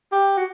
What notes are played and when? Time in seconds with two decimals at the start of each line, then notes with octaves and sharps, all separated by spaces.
0.12 G4
0.37 F#4